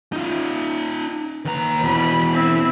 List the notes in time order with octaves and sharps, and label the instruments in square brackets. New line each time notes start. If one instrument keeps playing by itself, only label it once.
[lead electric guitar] D#4 F4
[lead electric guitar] D#2 A#5 [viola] B4
[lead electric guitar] B2 E3 [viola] B5
[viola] C4 E4